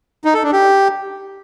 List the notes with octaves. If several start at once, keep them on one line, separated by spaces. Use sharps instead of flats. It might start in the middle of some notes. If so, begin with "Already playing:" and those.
D#4
A4
D4
G4